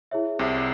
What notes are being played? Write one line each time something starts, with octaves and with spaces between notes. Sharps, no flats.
E4 G#4 C#5 E5
C2 C3